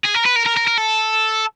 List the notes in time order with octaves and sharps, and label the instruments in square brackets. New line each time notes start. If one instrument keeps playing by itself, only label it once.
[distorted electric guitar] G#4
A#4
B4
A#4
A#4
A#4
A#4
A4